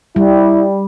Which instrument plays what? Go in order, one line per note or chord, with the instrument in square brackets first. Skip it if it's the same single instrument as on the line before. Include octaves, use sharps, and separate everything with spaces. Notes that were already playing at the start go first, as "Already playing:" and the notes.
[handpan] G3 [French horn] E4